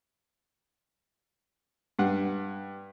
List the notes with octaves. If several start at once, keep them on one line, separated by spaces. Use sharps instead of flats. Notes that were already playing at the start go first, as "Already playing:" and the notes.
G2 F#5